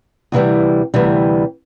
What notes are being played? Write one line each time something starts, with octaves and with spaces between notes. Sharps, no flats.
D2 C3 E3 G3
D2 C3 E3 G3